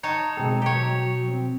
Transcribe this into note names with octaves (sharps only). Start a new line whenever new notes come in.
D#4 C#5 A5 A#5
B2 G#3 C4 A4 G5
F#3 G4 C#5
C4